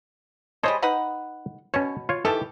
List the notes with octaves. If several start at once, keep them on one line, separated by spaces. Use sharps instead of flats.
G3 G#3 C5 C#5 D#5 A5
D#4 B4 F#5
B2 C#4 C#5
F4 C#5
D#3 E3 G4 A4 A5